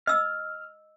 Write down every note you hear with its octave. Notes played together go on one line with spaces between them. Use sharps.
D#5 E6 F6